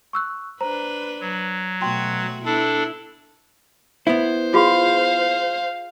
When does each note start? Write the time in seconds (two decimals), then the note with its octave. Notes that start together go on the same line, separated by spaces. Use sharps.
0.13 C#6 E6 F#6
0.61 D4 B4 C5 A#5
1.21 F#3
1.82 B2 A3 F#4 G5 C6
2.45 B3 D4 E4 A4
4.07 B3 E4 C5
4.54 F4 G#4 F5 C6